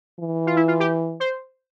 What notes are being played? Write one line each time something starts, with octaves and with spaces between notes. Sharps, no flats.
E3
F4
E4
F4
G4
C5